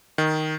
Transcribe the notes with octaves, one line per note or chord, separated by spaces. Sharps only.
D#3